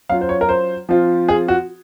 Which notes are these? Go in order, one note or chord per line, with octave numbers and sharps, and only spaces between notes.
F#3 C#4 F4 F5
C5
C#5
A#4
C5
F3 C4 F4
G#4
F#4